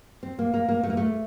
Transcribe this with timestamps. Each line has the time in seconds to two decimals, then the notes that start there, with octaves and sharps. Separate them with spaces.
0.23 C4
0.39 A#3
0.54 A#3
0.68 A#3
0.83 A3
0.90 A#3
0.97 A3